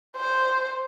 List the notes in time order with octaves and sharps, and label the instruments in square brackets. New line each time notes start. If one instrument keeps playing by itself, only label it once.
[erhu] C5